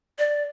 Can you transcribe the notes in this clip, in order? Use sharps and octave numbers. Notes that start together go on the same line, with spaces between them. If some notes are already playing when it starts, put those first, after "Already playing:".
D5